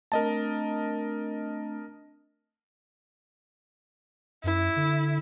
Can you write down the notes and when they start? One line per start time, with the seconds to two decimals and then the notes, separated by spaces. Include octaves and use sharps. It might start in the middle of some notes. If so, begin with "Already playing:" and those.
0.12 A3 C4 D4 A#4 D#5 A5
4.44 F#2 E4
4.76 D3